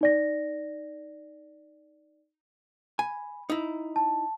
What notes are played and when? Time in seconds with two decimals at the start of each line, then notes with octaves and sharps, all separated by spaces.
0.01 D#4 D5 A#6
2.99 G#5 B5
3.50 D#4 E4
3.96 A5